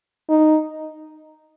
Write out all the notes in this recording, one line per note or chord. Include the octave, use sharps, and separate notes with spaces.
D#4